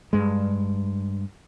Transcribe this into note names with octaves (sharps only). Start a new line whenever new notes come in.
G2 G#3